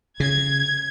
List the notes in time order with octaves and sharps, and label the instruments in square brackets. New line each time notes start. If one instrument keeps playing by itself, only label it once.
[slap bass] C#3 [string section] G#6